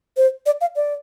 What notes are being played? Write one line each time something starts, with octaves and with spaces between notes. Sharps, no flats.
C5
D5
F5
D5